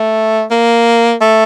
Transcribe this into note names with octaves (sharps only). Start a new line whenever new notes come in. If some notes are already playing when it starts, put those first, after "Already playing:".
Already playing: A3
A#3
A3